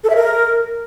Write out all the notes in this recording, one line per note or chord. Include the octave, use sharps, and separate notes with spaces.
A4
E5
A#4